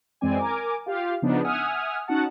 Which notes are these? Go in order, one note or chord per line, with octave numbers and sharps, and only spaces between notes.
F#2 E3 G#3 C4 D5 G#5
A#4 G#5 D6
F4 G4 F5
C#3 F3 B3 D4 D#4
E5 F#5 G#5 D#6 F6
C#4 D#4 F#4 F#5 A5